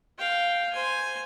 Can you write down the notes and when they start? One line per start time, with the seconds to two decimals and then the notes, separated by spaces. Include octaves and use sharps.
0.19 F5 G5
0.73 C5 G#5